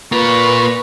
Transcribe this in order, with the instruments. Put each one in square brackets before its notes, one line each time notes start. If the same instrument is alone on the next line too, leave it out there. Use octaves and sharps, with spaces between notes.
[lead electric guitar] A#3 F4 [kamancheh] B4 C#6